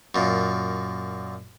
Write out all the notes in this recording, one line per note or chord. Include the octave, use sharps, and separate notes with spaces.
F#2 A#2